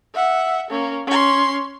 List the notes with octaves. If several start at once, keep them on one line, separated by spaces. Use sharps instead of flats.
E5 F#5
A#3 C#4
C#4 C6